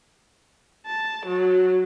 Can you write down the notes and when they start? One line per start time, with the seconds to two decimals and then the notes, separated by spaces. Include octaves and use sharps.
0.86 A5
1.27 F#3